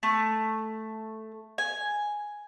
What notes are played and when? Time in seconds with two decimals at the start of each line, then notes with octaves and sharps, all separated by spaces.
0.03 A3
1.58 G#5